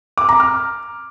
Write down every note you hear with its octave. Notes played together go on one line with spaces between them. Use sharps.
D6
A#5
F6